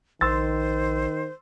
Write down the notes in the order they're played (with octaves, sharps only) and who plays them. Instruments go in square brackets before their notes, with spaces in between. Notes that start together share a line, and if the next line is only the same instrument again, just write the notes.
[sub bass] A#1 [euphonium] D#3 [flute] C5 [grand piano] C6 E6 A6